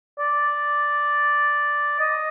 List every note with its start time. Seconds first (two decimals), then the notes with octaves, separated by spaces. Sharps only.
0.19 D5
2.00 D#5